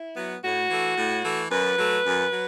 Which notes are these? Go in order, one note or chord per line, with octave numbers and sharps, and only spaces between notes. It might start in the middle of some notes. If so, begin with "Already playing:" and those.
Already playing: E4
F#3 B3
A2 F#4
E3 A3
A2
E3 A3
F#2 B4
F#3 A3
F#2
F#3